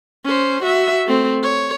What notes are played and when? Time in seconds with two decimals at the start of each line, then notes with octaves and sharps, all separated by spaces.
0.24 C#4 C5
0.63 F#4 E5
1.06 A3 C4
1.43 C#5